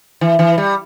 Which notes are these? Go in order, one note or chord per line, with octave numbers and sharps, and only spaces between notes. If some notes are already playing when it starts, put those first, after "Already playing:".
E3
E3
G3